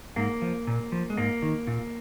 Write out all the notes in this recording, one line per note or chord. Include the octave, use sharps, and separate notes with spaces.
G#2 A#3
F3
A#2
F3
G#3
G#2 A#3
D#3
A#2